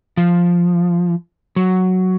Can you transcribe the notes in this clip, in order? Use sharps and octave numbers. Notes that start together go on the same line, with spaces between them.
F3
F#3